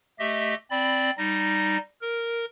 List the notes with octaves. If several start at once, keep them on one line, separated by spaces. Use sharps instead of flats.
A3 G4 D#5 E5
C4 D5 B5
G3 D#4 A#6
A#4